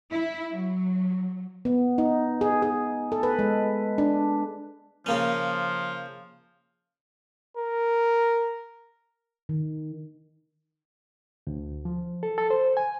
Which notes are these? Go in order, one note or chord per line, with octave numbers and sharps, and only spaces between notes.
E4
F#3
B3
D#4
G#4
G#4
A4
B4
G#3
D4
C#3 F3 A#3 C#4
A#4
D#3
D2
F3
A4
A4
C5
G#5